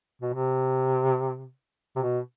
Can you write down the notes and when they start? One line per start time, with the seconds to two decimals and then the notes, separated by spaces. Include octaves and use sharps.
0.22 B2
0.34 C3
1.96 C3
1.99 B2